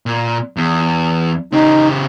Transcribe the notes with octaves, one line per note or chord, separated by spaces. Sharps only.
A#2
E2
C#3 D#4 G4